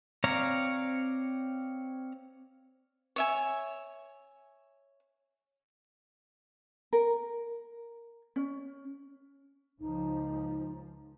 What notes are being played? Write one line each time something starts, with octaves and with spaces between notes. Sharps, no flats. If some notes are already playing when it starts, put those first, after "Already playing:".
C4 C#5 D5 F5 A#5
C#5 E5 G#5
A#4
C#4
C#2 F3 D#4